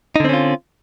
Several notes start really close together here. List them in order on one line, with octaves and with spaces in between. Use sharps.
D#4 D3 C4 C#4 F4